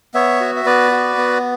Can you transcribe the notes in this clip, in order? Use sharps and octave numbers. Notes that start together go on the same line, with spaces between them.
B3 C#5 E5
F#4
E5
B3 B4 D5
F#4
B3